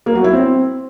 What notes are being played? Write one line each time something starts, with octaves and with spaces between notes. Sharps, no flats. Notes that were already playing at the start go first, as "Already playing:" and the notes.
A#3
F#3
E4
C4